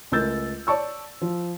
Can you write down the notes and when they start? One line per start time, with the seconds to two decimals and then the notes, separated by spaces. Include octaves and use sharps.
0.12 C#2 A3 A#4 E6 G6 A6
0.67 C#5 D5 A5 C#6 E6
1.22 F3